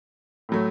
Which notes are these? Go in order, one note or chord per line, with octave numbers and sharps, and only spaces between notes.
A2 F#3 A3